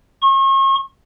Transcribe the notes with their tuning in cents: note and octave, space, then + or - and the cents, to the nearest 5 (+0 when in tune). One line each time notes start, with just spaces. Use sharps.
C#6 -40